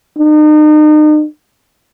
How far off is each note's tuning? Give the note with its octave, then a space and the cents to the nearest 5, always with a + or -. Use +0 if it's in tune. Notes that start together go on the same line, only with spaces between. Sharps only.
D#4 -40